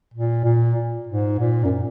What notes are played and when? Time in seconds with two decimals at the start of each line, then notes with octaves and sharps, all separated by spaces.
0.14 A#2
0.45 A#2
1.07 G#2
1.39 A#2
1.65 F#2